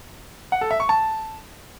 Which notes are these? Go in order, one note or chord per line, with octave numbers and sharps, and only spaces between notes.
F#5
A4
E5
C#6
A5